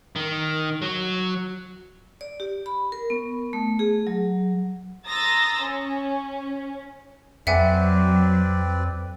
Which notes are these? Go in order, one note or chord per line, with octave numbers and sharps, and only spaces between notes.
D#3
F#3
D5
G4
B5
A#4
B3
A3
G#4
F#3
A#5 C6 D#6 E6 A6 A#6
C#4
F2 F#3 C4 B4 D5 E5 F#5 G#5